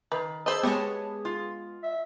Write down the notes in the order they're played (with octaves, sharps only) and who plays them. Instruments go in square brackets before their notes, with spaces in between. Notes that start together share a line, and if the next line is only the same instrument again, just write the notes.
[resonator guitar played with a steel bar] D#3 [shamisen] B4
[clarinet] G#4 [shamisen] C5 D#5 [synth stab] A5 B5 E6
[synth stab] G#3 B3 [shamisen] G4 [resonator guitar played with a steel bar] C#5 A5
[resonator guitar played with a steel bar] F4
[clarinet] E5